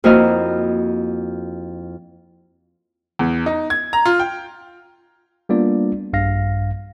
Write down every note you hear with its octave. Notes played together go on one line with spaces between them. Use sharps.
F2 A#3 E4 F#4 D#5 F6
E2
D#4
G#6
A#5
F4
G5
G3 A#3 B3 D4 F4 D5
A#1 G2 F5 A#6